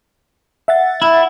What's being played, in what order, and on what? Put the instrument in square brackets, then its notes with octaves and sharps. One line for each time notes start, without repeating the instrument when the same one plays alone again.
[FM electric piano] E5 F#5 A6
[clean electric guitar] E4